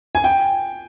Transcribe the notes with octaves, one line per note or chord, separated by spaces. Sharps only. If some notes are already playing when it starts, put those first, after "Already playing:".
G#5
G5